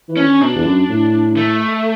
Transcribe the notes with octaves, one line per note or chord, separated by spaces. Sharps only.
E3
C#4
D3
B2 D4
E2
F#2
A2
A3